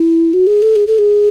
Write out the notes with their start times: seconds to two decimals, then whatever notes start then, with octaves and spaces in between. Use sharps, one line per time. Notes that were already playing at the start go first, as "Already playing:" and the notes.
Already playing: E4
0.33 F#4
0.47 G#4
0.62 A4
0.76 G#4
0.87 A4
0.98 G#4